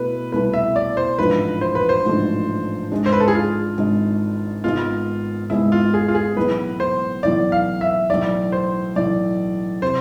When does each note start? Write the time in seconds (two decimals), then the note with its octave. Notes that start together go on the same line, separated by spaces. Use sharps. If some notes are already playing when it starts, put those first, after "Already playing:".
Already playing: B2 A3 E4 B4
0.32 C2 B2 A3 E4 B4
0.54 E5
0.76 D5
0.97 C5
1.19 A1 G#2 F3 A3 D4 B4
1.61 C5
1.75 B4
1.89 C5
2.05 A1 G#2 F3 A3 D4
2.92 G#1 G#2 G#3 D4
3.06 C5
3.12 B4
3.20 A4
3.28 G#4
3.35 F4
3.78 G#1 G#2 G#3 D4
4.64 G#1 G#2 G#3 B3 F4
5.50 G#1 G#2 G#3 B3 E4
5.72 F4
5.94 G#4
6.08 F4
6.15 G#4
6.37 B1 A2 E3 B3 B4
6.80 C5
7.23 B1 A2 E3 B3 D5
7.52 F5
7.81 E5
8.10 B1 A2 E3 D5
8.52 C5
8.96 B1 A2 E3 D5
9.82 C3 C5